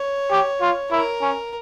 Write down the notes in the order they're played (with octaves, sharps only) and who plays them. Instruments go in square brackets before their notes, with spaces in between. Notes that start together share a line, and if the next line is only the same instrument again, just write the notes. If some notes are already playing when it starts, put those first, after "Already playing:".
Already playing: [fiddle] C#5
[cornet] G4
F4
[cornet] E4 [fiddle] A#4
[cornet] C#4